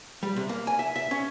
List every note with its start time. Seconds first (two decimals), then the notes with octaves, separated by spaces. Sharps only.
0.23 G3
0.37 C3
0.49 A#3
0.67 G#5
0.79 E5
0.96 E5
1.11 C#4